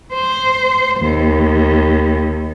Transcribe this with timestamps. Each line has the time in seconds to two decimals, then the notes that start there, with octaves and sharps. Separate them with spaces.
0.12 C5
0.98 D#2